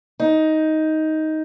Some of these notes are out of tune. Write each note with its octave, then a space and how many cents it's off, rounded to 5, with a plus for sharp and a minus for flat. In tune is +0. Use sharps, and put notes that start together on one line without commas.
D#4 +10